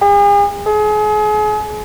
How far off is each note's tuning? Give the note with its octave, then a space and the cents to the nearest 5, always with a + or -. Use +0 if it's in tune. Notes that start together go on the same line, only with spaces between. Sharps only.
G#4 -40
G#4 +35